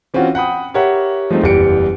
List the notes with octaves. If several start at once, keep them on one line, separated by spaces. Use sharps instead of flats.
E3 C4 C#4 F4 F#4
F#5 G5 B5 D#6
G4 A#4 C#5 E5 F#5
F3 G#3 A3 C4 D#4
F#1 E2 G3 G4 C#7 D7